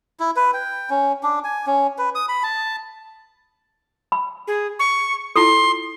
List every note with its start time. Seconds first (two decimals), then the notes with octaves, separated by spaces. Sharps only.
0.20 E4
0.36 B4
0.53 G5
0.90 C#4
1.23 D4
1.44 G#5
1.67 C#4
1.98 B4
2.15 D#6
2.29 B5
2.43 A5
4.12 B5
4.47 G#4
4.79 C#6
5.36 E4 F4 A4 C6